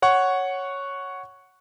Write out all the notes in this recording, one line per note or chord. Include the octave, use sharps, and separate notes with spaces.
C#5 F#5 C#6